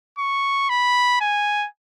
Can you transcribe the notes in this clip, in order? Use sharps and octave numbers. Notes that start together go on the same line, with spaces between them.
C#6
B5
G#5